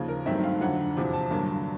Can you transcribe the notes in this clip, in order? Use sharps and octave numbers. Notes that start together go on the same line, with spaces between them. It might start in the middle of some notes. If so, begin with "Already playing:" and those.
Already playing: D#2 C#3 F3
A#4
G2 D#3 F#3 A3 C4 E5
F5
F2 D3 F#3 F#5
E2 C3 F3
A5
G2 D3 F#3 A#3